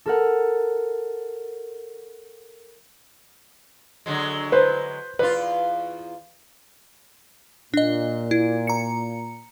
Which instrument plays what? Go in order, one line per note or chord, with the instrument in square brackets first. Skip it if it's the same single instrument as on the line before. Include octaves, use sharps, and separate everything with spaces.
[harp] A4 A#4 F#5
[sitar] D3 F#3 G#3
[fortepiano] B4 C5
[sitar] E2 F4 [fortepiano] B4
[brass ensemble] A#2 [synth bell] D4 D#5
[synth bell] E4
A#5 C#7